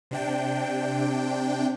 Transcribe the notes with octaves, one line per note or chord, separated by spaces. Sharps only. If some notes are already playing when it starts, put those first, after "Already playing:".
C3 D4 G5